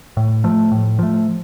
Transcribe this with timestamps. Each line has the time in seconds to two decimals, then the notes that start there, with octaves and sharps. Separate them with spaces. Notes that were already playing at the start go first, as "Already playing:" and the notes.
0.17 A2
0.44 F3 A3
0.71 A2
0.99 F3 A3